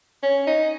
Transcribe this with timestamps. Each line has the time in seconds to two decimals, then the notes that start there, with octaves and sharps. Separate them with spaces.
0.23 C#4
0.47 D#4